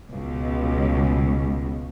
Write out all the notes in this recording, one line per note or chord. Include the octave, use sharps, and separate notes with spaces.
C#2 B2